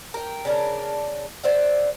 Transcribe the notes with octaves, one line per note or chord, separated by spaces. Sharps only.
A#4 G5
C#3 D4 A#4
C5 D5 E5 F#5